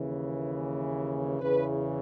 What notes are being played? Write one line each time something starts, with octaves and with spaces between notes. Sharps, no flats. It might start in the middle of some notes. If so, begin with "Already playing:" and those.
Already playing: D#2 C#3 E3
E2 C#3 E3 B4